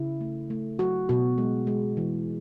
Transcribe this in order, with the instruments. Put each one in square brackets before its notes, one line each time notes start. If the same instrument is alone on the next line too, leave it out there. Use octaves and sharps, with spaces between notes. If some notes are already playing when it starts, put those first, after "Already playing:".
Already playing: [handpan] C#3 E4
A3
A3
F#3 F#4
B2 F#4
G#3
G#3
E3